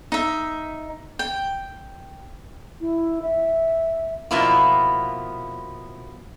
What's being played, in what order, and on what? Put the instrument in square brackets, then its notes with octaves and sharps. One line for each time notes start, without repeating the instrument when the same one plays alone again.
[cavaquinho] D#4 E5
G5
[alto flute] E4
E5
[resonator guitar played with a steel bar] B2 F3 A#3 B3 E4 F4